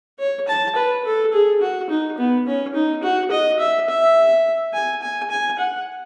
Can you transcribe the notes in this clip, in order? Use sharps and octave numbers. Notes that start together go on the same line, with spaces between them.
C#5
A5
B4
A4
G#4
F#4
D#4
B3
C#4
D#4
F#4
D#5
E5
E5
G#5
G#5
G#5
F#5